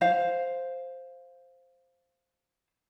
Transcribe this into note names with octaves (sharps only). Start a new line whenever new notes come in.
C5 F5